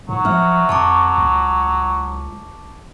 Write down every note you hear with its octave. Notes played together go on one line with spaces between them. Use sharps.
G#2 F#3
F3 E5 F6
F2 A5 C#6 D6
C#2